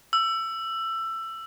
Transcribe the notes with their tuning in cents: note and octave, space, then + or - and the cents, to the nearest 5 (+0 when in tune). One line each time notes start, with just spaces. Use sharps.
E6 +20